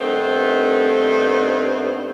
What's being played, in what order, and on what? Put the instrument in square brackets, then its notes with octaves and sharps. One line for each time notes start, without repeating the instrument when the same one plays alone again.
[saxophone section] G2 D#3 A3 B3 C4